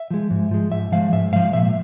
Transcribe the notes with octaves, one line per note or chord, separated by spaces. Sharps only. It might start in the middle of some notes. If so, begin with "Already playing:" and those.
Already playing: E5
F3 G#3
G#2
F3 G#3
G#2 E5
F3 G#3 F5
G#2 E5
F3 G#3 F5
A#2 E5